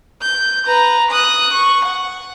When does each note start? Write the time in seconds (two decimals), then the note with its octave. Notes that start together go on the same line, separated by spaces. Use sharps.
0.22 G6
0.66 B4 A#5
1.11 D#6 F#6
1.53 C#6
1.85 F#5